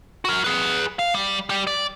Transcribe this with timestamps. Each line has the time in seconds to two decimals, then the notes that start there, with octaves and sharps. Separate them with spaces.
0.25 F#4 A#4
0.44 G#4 B4
0.99 F5
1.15 G3
1.50 G3 G4
1.67 D5